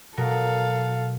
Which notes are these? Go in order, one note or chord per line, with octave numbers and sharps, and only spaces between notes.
B2 F#3 A4 A#4 F5